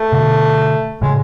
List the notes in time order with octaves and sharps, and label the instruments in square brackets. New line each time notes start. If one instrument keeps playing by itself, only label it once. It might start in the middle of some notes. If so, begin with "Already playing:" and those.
Already playing: [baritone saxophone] A3
[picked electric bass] B2 D3
[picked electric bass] A2 C#3 [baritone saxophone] G#3